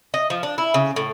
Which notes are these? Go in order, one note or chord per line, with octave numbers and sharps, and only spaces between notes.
D#5
F3
D4
E4
C#3
A2